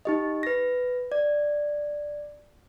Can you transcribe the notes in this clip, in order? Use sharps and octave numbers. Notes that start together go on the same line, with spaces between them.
D#4 G4 D#5
B4 A#6
D5